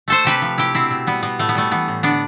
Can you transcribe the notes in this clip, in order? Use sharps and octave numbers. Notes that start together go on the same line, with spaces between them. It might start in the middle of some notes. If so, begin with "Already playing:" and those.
A3 A4 C5
C3 G4 B4
F3
C3 E4 G4
B2 C4 E4
B2
G3 B3
B2 B3
A2 A3
B3
G3 A3
E3 B3
A2
D3 B3 D4